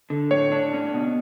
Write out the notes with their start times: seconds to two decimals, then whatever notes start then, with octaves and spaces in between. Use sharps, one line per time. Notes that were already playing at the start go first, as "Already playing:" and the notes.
0.10 D3
0.31 A2 C#5
0.52 D4
0.73 C#4
0.94 B2